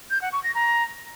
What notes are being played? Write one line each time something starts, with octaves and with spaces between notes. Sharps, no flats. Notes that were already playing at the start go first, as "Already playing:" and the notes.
G6
F#5
C#6
A#6
A#5